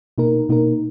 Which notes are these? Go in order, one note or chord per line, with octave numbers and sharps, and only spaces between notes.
B2 A#3 D#4 A#4
B2 A#3 D#4 A#4